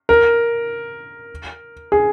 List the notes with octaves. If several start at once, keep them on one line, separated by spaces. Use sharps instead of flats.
A#4
G#4